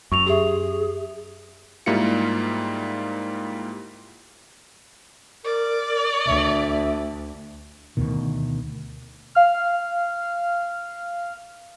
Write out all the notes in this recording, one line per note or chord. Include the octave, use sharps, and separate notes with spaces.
F#2 C#6 F7
G4 G#4 E5
G#2 G3 A#3 E4 F4 C#7
A#4 D5
D2 E5
D2 B2 D#3
F5 F6